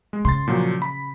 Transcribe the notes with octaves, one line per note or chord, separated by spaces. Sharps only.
G#3
C#3 C6 A6
A#2 F3 F#3
B5